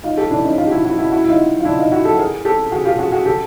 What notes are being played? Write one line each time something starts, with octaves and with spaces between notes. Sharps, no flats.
D#4 F4
G4 A4
D4 E4
C#4 D#4
D#4 F4
G4
E4 F#4
E4 F#4
E4 F#4
E4 F#4
E4
D#4 F4
F4
D4 E4
D#4 F4
E4 F#4
G4 A4
G#4 A#4
G4 A4
F#4 G#4
F4 G4
F#4 G#4
F#4 G#4
G4 A4